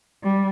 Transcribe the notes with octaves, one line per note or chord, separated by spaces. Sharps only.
G3